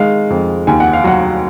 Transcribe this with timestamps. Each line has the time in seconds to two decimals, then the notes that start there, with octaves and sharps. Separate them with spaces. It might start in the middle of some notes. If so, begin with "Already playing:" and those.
Already playing: D#3 G#3 F5
0.30 F2
0.67 D#2 G#5
0.80 F#5
0.93 F5
1.04 F#3 F#5